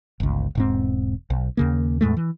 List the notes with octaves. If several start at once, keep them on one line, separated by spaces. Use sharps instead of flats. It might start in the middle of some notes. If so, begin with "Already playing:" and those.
G1 C#2
E1 G#2 C4
B1
D#2 C#3 A#3
E2 A2 G#3 A3
E3